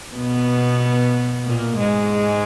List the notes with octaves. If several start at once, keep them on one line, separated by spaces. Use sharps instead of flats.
B2 B3
A#2 A#3
G#2 G#3